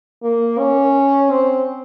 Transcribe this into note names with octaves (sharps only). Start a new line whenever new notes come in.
A#3
C#4
C4